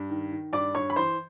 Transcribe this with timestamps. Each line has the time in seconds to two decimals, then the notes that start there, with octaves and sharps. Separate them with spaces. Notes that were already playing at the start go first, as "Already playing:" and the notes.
Already playing: G2
0.10 D#3
0.32 D#3
0.53 G2 D5 D6
0.75 G2 C#5 C#6
0.90 B5
0.96 E3 C5 C6